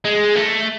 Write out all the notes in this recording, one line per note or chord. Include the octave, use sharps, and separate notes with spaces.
G#3
A3